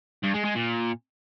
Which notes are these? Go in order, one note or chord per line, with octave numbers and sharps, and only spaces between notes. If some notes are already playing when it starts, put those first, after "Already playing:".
G2
G#3
G#3
A#2